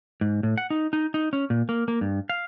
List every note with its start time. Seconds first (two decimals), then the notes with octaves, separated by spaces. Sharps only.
0.21 G#2
0.43 A2
0.58 F#5
0.70 D#4
0.93 D#4
1.14 D#4
1.33 C#4
1.50 A#2
1.69 A#3
1.88 A#3
2.01 G2
2.29 F5